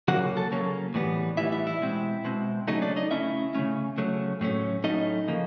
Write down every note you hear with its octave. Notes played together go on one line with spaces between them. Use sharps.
C#3 F#3 A#3 C#4 F#4 F#5
A4 A5
C#3 F#3 A#3 C#4
A2 E3 G3 B3
A2 E3 G3 B3 E4 E5
E4 E5
E4 E5
B2 G#3 C4
B2 G#3 C4
C#3 F#3 A3 C#4 D#4 D#5
D4 D5
D#4 D#5
C#3 F#3 A3 C#4 E4 E5
C#3 F#3 A3 C#4
C#3 F#3 A3 C#4
A2 F#3 A3 C#4
A2 F#3 A3 C#4 D#4 D#5
C#3 F3 A#3